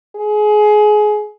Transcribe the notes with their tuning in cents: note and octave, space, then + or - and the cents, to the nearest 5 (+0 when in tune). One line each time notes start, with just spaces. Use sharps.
G#4 +25